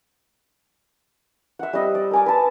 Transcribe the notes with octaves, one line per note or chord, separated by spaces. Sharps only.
E5 F#5
G3 C4 D#5
D5
A#4 G#5 D6
B4 A5